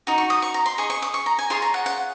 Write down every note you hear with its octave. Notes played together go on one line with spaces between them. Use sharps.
D#4 F#4
C#6
D#6
C#6
A#5
C6
G#4 D#5 C#6
C#6
D#6
C#6
A#5
G#5
F4 G#4 C#5 C6
A#5
F#5
F#5